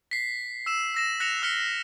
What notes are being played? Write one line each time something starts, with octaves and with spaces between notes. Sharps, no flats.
B6 C7
E6 E7
E6 A#6 E7
F#6 A#6 C#7 E7 F7
E6 F6 B6 C#7